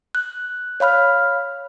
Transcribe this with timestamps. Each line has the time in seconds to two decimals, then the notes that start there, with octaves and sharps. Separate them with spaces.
0.15 F#6
0.80 C#5 F5 B5 F6